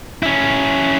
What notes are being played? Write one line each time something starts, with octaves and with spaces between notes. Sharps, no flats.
C#4 E4